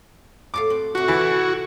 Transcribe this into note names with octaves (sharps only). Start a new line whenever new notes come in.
A2 A4 F5 D6
C4 F#4
C3 A3 F#4
E3